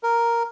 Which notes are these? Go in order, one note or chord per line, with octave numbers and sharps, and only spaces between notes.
A#4